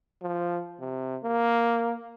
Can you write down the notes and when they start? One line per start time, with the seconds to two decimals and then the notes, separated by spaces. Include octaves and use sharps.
0.22 F3
0.80 C3
1.24 A#3